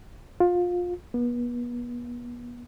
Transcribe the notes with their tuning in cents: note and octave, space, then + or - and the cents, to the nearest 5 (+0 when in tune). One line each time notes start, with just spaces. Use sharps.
F4 +20
B3 -35